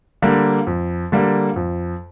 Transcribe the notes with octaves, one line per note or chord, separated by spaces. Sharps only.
D3 G3 A#3
F2
D3 G3 A#3
F2